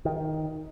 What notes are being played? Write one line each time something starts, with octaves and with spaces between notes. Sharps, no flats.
D#3